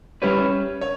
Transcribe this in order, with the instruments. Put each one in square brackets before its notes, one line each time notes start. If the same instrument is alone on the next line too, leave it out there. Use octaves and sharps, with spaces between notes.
[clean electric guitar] G3 C#4 E4 G4 B4 [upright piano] C#5
[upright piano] C#5